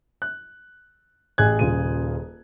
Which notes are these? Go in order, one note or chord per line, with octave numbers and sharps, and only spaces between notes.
F#6
A1 G#4 G#5 F#6 G#6
D#1 C#3 F4 G#4 D#7